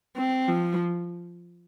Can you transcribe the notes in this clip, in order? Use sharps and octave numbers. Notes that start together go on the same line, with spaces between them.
C4
F3